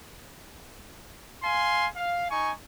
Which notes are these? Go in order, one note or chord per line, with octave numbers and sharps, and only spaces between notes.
F5 G#5 C6
F5
D#4 G#5 C#6